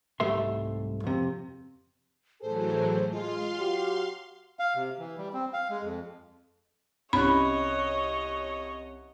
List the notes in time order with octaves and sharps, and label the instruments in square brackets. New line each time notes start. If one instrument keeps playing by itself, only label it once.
[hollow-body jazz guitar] C2 G#2 G3 A3 E5 C6
F2 C3
[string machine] A2 E3 F#3 [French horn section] G#4 A4 [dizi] C5
[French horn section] G#3 [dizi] F4 [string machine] F5 C6
[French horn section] F#3 F#4 G4
[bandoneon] F5
C3
E3
G3
C4
F5
G#3
F2
[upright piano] C2 C#4 F#6 [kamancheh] C#5 D#5 [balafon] B5